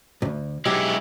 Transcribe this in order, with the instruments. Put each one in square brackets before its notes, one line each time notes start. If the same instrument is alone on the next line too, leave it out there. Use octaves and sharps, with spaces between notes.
[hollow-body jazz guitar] D2 G2
[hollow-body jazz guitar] B1 G4 [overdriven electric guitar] G#3 E4